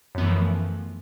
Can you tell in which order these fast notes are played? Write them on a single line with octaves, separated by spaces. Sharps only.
F#2 B3 E3 A3 F3